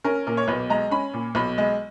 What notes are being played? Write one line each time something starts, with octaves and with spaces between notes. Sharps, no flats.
C#4 A#4
A#2 A#4
C#5
B1 B4
G#3 A#5
C#4 B5
A#2
B1 B5
G#3